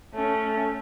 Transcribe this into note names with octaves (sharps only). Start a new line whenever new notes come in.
A3 C#4